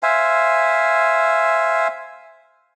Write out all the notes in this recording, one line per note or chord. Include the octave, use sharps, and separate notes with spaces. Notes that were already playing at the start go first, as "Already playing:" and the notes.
C5 E5 F5 G#5